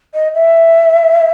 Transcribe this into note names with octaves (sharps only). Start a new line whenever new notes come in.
D#5
E5